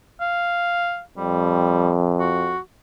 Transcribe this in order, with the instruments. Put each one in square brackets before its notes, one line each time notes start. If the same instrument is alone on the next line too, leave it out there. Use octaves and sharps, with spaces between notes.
[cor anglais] F5
[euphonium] F2 [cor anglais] G3
[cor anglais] F#4